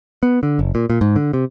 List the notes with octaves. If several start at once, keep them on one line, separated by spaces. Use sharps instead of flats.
B3
D3
F#1
A#2
A#2
G#2
D3
C3